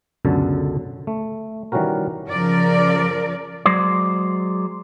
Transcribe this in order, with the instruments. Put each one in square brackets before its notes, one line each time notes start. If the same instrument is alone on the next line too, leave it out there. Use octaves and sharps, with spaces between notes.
[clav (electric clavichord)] C#2 F#2 B2 D3 A4 A5
A3
D#3 E3 G3 C#4 F#4 A#4
[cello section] C#3 F3 A#4 D5
[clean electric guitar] F#3 G#3 C5 D5